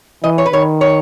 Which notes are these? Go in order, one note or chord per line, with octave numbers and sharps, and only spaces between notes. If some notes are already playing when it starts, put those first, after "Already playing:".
E3 D#5
C#5
B4
D#3 C#5
C#5